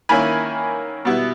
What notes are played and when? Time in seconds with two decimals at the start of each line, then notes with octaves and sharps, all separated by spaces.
0.09 D#3 A#3 C#4 E4 G#5 B5
1.05 B2 G3 B3 E4